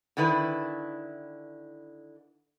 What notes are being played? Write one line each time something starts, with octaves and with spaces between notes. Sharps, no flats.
D3 D#3 E4 B4